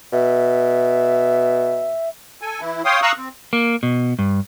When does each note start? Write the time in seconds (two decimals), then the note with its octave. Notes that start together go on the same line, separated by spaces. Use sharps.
0.12 B2 E5
2.41 A4 G#5
2.61 E3 E4
2.85 C#5 F5 G5 C6 D#6
3.02 F5 A#5 C#6 D#6 E6 F#6
3.17 C4
3.53 A#3
3.83 B2
4.19 G2